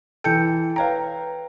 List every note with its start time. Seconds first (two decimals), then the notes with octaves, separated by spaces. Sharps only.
0.24 E3 A4 G5 G6 C#7
0.76 B4 C#5 F5 G5 A#5